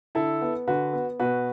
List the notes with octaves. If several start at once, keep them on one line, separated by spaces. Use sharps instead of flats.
D3 E4 A4
B3
D3 F#4 B4
B3
B2 F#4 B4